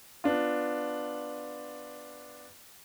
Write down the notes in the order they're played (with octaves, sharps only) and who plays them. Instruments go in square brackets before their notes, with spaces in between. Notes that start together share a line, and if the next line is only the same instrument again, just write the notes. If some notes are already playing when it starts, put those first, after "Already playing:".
[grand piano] B3 D4 F4